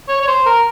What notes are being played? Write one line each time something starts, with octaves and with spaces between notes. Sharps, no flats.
C#5
C#5
C5
A#4